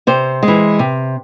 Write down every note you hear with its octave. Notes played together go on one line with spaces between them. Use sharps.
C3 C5
G#3
E3
C3